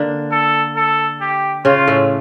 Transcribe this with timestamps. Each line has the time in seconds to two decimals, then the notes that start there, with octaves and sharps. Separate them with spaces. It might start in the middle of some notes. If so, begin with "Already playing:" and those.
Already playing: D3 A#3 D4
0.31 A4
0.76 A4
1.21 G4
1.65 C#3 C#4 F4
1.87 A2 A3